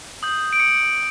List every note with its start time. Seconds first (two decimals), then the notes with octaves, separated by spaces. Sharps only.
0.23 D#6 G6
0.53 D7
0.60 D6 C#7